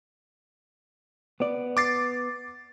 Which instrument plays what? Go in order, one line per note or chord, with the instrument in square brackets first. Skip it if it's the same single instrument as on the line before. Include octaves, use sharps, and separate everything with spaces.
[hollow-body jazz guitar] B3 D5
[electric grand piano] D6 A6 C7